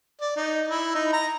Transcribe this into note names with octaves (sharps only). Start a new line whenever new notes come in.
D5
D#4
E4
D#4
A#5